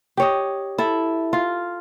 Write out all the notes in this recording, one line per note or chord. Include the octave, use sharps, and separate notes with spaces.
G4 C#5 D#5
E4 A4
F4